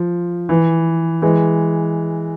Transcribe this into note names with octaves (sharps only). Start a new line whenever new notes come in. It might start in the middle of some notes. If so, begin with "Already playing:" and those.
Already playing: F3
E3
E3 G#3